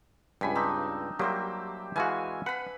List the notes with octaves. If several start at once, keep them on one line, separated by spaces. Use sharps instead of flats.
C#2 G2 G5 G#5 B5
C4 D4 D#4
F#3 G3 A#3 G4 C5 E5
E3 G#3 F#4 E5 F5 G#5
B4 F#5 B5